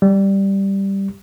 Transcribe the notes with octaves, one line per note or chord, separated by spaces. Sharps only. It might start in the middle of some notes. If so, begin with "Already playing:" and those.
G3